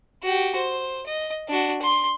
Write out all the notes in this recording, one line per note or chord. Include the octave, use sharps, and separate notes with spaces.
F#4 G4
C5
D#5
D4 F#4
C6